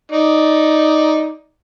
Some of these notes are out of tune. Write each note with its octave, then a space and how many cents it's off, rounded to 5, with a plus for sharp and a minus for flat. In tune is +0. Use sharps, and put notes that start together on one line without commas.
D#4 +5 D5 +0